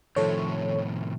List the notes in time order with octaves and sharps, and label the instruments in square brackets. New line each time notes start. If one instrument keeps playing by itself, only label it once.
[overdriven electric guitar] A2 C3 [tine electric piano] D#3 F3 [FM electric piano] A4 C#5